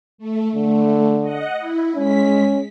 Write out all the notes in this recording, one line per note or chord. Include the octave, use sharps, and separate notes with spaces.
A3
D3 A3
D#5 F#5
E4
G#3 C#4 B6